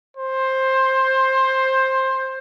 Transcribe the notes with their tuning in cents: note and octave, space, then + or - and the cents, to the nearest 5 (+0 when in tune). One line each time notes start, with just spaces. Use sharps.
C5 +15